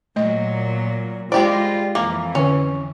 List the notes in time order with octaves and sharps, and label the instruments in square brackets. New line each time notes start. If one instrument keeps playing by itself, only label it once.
[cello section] A#2 F#3 [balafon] A3 D#5
[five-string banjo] G3 G4 D5 [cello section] G#3 F4 [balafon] C5
[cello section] F2 E3 [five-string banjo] A#3 [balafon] D6
[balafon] D3 B4 [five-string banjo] C#4